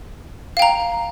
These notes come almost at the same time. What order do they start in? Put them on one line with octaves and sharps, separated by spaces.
F5 G5 A#5